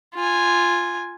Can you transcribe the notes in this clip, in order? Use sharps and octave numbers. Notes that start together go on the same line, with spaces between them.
F4 G#5